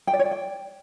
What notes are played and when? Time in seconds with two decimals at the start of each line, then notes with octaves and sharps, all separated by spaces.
0.07 G5
0.13 D5
0.19 C#5
0.25 D5
0.31 G5